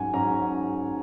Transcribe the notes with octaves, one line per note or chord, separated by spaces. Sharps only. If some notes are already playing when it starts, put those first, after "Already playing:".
Already playing: G#2 F#3 C#4 F#5 G#5
G#2 F#3 C#4 A#5